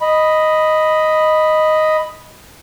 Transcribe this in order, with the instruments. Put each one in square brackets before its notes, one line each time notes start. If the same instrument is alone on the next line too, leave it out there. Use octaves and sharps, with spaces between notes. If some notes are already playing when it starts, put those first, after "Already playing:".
[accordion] D#5 B5